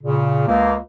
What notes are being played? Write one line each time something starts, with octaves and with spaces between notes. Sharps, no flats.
A#2 C#3
C#2 A#3